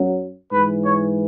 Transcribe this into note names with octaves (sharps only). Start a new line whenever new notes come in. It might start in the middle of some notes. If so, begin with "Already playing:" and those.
Already playing: F#2 F#3
G#2 E3 B4
C#5